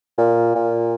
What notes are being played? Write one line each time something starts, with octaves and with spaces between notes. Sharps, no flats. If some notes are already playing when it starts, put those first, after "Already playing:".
A#2
A#2